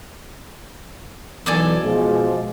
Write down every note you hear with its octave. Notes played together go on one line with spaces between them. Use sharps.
B1 E3 A4 D5 G#5
B2 F3 G#3